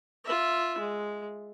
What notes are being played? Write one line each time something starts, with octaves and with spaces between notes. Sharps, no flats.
F4 E5
G#3